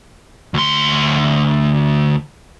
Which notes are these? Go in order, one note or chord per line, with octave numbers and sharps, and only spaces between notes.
D2 C6